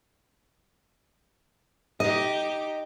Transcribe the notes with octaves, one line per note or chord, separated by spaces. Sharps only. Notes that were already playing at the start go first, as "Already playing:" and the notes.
D#4 G4 D#5